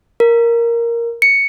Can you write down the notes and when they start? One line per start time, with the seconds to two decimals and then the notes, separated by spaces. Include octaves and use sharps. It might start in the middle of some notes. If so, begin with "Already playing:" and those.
0.20 A#4
1.22 C#7